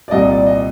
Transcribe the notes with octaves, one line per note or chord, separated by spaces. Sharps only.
D5
C2 A#2 G3 D#5
D5
D#5